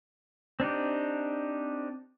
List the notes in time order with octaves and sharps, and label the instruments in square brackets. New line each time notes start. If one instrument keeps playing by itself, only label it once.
[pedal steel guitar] C4 D4 D#4 G4